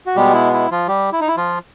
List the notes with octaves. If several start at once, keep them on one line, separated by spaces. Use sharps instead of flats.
F#4
B2 G3 G#3 B3 G4
E4
E4
F3 F4
G3 G4
E4
D#4
E4
F3 F4